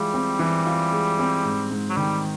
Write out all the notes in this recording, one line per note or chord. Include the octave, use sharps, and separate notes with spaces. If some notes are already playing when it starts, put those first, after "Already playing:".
Already playing: E3 G3 G#3 F4
C4
E3
F4
G#3
C4
G#2
G#2
F#3
D#3 G3